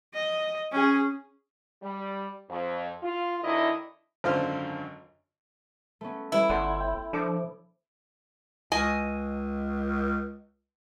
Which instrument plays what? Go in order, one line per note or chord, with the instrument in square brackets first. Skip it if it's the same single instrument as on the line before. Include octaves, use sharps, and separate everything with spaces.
[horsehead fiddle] D#5
C#4 G#4
[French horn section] G3
F2
F4
D2 D3 D#3 E4 D#5
[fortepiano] G#1 F#2 D3 F4 C5 F6
[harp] A3 B3 C#4
[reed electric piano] G3 B4 E5 [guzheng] E4
[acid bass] G1 [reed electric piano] A4 D5 F#5 [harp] C6 G6
[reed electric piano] G5
[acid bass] F3 [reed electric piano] D4 A4 D6
[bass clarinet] C#2 [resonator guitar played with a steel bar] D#5 G#5